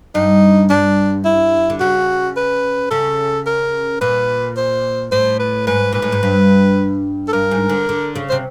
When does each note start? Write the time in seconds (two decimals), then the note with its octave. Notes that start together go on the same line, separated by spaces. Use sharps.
0.15 G2 D#4
0.70 G2 D4
1.25 E4
1.70 D3
1.80 C#3 F#4
2.36 B4
2.90 C#3 A4
3.46 A#4
4.01 A#2 B4
4.57 C5
5.12 A2 C5
5.39 B4
5.67 G#2 B4
5.92 A#2 B4
6.02 A2
6.12 G#2
6.23 G2
7.28 A4
7.33 G2 A#4
7.51 G#2
7.69 D3
7.89 D3
8.15 C#3
8.29 C5
8.32 C3